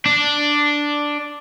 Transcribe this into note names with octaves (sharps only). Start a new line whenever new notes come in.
D4